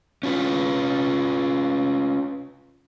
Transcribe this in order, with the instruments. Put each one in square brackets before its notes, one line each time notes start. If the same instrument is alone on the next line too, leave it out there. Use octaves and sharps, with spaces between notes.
[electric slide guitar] C#4 F4 B4